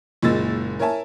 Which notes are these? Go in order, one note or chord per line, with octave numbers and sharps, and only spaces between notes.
F#1 A#2 G#3 E6 A6
A#4 C#5 E5 G#5 A5